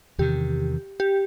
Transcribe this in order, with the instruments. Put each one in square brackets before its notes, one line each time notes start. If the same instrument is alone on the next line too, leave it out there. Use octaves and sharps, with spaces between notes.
[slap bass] E2 C3 D#3 [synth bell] G4
[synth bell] G4